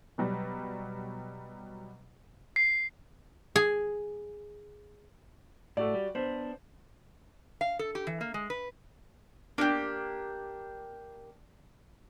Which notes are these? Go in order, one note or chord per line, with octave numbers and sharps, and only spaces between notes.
B2 F#3 G3
C7
G#4
A2 A3 F#4 D5
G3
B3 D4 C5
F5
A4
G4
E3
A#3
G#3
B4
A#3 D4 F#4 G4